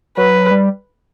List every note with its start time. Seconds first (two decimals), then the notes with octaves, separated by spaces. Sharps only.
0.17 F#3 B4
0.51 G3